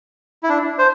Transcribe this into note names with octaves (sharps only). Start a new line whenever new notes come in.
E4
D4
C5